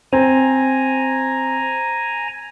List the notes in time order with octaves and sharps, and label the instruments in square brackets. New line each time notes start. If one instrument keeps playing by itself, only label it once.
[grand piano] C4 [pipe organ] G#5 A#5